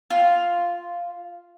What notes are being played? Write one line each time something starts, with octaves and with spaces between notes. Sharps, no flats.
F4